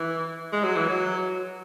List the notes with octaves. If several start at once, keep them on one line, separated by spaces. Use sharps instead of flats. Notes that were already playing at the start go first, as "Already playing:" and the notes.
Already playing: E3
G#3
F#3
E3
F#3